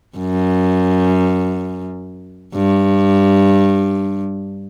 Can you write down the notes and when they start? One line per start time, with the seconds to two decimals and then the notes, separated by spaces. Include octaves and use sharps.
0.18 F#2
2.55 G2